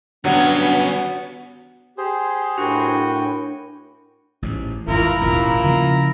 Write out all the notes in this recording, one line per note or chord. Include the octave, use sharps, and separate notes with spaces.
G2 D3 F#3 B3 C#4
G4 G#4 C5
A2 D4 F#4 A#4 G5 G#5 B5
A1 G#2
G#1 E2 G2 E4 F4 A#4 A#5
E1 A1 D#2 F4 A#4
C#3 F3 A#3